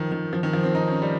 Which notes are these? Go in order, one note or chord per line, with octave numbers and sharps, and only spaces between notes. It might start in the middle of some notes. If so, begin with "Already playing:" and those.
Already playing: D#3 F3
D#3
F3
D#3
F3
C4
D#4
C#4
G3